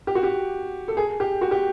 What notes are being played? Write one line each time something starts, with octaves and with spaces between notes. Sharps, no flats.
G4
F#4
G4
A4
G#4
G4
F#4
G4